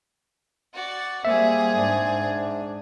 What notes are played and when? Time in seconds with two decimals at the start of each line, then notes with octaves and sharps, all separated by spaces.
0.73 F#4 D5
1.25 G3 A#3 C4 G#4 E5
1.73 G#2 D4